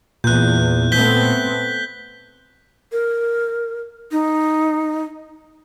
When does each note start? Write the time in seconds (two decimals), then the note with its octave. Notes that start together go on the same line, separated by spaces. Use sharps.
0.24 E2 A#2 F#6 G6
0.92 A3 B3 C4 G6 B6 G7
2.92 A#4
4.12 D#4